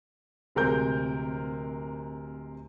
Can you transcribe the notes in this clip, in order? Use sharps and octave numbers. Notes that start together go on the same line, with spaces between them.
D1 C3 G#3 A#4 G6